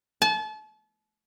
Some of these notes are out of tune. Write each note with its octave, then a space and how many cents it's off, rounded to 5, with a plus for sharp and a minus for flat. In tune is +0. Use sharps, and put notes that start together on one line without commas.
A5 -35